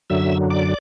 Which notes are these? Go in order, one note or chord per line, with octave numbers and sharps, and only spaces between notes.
F#2 D3 F#3 E5 E6
D5 D6